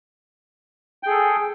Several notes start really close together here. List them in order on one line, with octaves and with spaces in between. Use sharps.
G5 G#4 A4